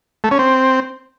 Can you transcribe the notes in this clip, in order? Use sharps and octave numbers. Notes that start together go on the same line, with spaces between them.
A3
C#4
C4